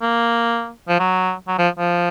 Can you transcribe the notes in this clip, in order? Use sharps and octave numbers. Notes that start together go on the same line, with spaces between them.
A#3
F3
F#3
F#3
F3
F3